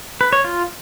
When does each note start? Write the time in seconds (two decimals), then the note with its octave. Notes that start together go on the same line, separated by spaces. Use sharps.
0.21 B4
0.33 C#5
0.44 F4